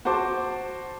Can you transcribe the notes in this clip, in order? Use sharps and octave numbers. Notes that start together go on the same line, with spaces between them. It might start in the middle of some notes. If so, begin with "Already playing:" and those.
F#4 C5 A5 C6 D6